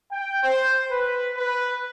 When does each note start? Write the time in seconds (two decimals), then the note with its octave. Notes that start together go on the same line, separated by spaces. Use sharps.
0.11 G5
0.43 C5
0.90 B4
1.35 B4